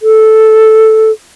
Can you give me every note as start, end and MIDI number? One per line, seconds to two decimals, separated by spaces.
0.01 1.11 69